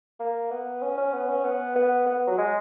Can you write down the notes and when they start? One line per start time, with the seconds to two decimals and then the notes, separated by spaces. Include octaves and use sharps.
0.20 A#3
0.51 B3
0.82 C#4
0.98 C#4
1.13 B3
1.29 C#4
1.44 B3
1.75 B3
2.06 B3
2.27 F#3
2.38 G#3